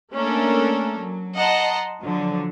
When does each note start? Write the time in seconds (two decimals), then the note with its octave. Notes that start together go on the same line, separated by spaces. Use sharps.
0.14 A3 A#3 C#4 D4 A4 A#4
0.98 F#3
1.36 D#5 F#5 A5 A#5 C6
2.01 D3 F3 F#3